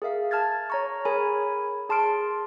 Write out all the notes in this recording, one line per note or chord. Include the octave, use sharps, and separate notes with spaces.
G#4 A#4 E5 F5
A5 F6 G#6 A6
C#5 A#5 C#6
G#4 A#4 C#5 G#5 B5
G#4 A5 C6 F6 D7